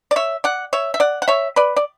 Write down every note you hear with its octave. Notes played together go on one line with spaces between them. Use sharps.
D5
C#5 E5
D5 F#5
C#5 E5
E5
D5 F#5
F#5
C#5 E5
B4 D5
D5